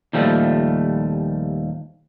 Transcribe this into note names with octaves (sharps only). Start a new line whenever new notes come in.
D#2 A#2 F3 G3 A3